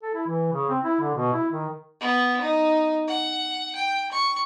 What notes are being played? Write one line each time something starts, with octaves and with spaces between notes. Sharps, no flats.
A4
E4
E3
C#3
C4
E4
D3
B2
E4
D#3
B3
D#4
F#5
G5
C#6